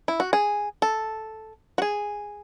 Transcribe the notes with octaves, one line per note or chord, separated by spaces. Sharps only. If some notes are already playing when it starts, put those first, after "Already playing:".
E4
F#4
G#4
A4
F#4
G#4